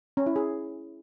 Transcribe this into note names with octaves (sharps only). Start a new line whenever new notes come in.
C#4
E4
G#4